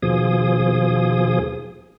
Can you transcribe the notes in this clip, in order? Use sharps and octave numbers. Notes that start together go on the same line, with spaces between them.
D#2 B2 F3 G#4 D#6